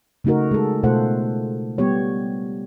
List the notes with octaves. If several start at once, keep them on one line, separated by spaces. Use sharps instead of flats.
C#3 A3 D#4 F#4 A#4
G#3 A4
B2 A3 F4 A4 C5 F#5
G3 B3 G4 C#5